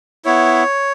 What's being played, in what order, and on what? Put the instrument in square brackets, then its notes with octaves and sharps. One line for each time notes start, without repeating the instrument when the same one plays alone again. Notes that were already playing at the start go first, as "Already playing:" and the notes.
[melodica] B3 E4 C#5